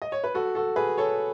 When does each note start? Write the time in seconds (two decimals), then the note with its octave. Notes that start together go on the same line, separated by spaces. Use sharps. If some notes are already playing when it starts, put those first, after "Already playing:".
0.02 D#5
0.12 C#5
0.24 B4
0.34 F#4 A4
0.55 F#4 A4
0.76 G#4 B4
0.98 A4 C#5